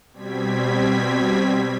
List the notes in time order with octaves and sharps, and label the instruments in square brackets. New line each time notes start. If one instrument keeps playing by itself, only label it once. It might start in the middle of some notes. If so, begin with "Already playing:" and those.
[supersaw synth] B2 G3 C4 G#6 B6